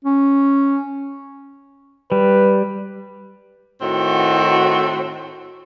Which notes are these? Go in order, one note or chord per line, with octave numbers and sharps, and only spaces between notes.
C#4
G3 B4
A2 D#3 C4 F#4